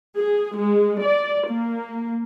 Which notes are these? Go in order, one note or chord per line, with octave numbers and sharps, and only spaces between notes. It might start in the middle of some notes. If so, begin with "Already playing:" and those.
G#4
G#3
D5
A#3